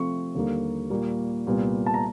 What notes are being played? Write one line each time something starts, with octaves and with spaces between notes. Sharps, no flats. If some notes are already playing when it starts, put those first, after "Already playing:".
Already playing: C3 F3 A3 C4 C#6
D#2 D3 G3 A#3
A#2 G3 A#3
C2 A#2 G3 B3
A5
A#5